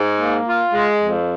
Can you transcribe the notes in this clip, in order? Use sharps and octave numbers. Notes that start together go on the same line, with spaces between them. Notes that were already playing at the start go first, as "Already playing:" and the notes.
Already playing: G#2
A#3
F4
G#3
F2